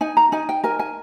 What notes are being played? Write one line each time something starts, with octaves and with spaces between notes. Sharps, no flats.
D#4 G#5
A#5
D#4 G#5
G5
A#4 G#5
G#5